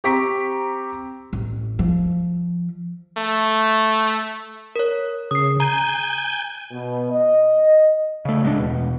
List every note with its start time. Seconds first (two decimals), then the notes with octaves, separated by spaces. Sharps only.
0.04 C4 G4 A#5 C#6 B6 D7
1.33 A1
1.79 F3
3.18 A3
4.76 A#4 C#5
5.31 C#3 D#6 C7
5.60 G#5 A#5 G6
6.72 B2
7.11 D#5
8.25 C#3 A3
8.43 D1 G#3 A3 D4
8.59 E2 B2